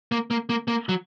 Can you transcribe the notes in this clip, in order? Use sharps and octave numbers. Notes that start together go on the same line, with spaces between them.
A#3
A#3
A#3
A#3
F#3